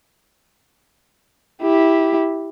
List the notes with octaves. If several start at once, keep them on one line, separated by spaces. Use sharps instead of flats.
E4 G4